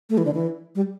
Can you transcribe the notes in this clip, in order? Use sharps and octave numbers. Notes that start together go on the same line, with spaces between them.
A3
E3
D3
E3
G3